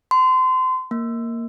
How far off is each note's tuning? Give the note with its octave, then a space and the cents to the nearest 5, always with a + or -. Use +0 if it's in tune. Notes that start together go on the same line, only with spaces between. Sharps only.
C6 -30
A#3 -10